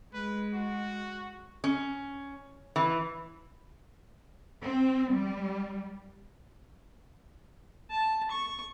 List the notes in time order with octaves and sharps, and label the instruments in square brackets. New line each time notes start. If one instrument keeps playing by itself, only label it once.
[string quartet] G#3 [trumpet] B4
[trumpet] F#4
[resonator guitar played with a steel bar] C#4
E3
[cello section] C4
G3
[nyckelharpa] A5
C#6